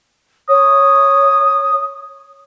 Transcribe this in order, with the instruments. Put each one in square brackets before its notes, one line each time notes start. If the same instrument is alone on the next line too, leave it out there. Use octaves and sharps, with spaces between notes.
[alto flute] C#5 [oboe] D#6